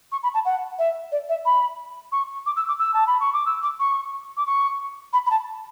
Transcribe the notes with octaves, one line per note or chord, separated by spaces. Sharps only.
C#6
B5
A5
F#5
E5
D5
E5
B5
C#6
D6
E6
D6
E6
A5
B5
C#6
D6
E6
D6
C#6
D6
C#6
B5
B5
A5